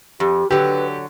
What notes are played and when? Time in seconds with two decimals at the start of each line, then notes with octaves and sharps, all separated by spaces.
0.20 F2 G4
0.51 D3 F#3 G4 B4